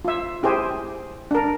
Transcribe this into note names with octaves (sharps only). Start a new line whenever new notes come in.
F4 E5
E4 G4 G#4 C5
D4 A#4